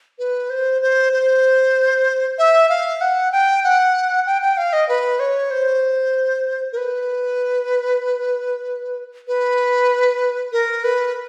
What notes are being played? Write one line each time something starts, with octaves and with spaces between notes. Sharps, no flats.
B4
C5
C5
C5
E5
F5
F#5
G5
F#5
G5
G5
F5
D#5
B4
C#5
C5
A#4
B4
B4
A#4
B4